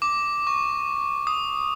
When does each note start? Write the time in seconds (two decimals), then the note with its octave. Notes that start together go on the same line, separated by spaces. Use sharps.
0.02 D6
0.47 C#6
1.27 D#6